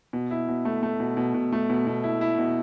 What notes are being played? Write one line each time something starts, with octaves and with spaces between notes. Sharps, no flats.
B2
E4
B2
A3
A3
B2
B2
B2
A3
B2
B2
E4
E4
B2